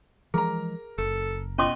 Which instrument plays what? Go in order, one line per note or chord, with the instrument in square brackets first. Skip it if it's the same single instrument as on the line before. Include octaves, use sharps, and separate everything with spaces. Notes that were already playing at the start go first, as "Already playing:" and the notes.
[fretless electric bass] E3 F3 G#3 [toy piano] G#4 [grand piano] A#4 A#5
[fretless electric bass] F#1 [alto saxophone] A4
[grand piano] B2 [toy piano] C#4 C6 D6 [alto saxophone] D#5